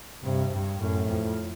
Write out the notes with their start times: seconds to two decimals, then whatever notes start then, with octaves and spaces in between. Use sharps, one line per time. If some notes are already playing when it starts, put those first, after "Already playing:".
0.23 G2 C3
0.53 G2
0.80 F#2 A2
1.09 F2